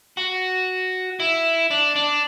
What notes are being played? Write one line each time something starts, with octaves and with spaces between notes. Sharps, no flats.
F#4
E4
D4
D4